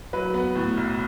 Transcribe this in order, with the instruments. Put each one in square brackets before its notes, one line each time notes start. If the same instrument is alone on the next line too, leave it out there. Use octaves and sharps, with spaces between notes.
[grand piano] F#3 B4
B3
A2
B1